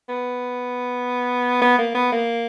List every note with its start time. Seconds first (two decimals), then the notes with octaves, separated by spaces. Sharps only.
0.09 B3
1.62 B3
1.79 A#3
1.94 B3
2.12 A#3